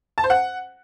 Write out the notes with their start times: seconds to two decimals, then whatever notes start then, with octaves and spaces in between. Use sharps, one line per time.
0.18 A5
0.24 C5
0.30 F#5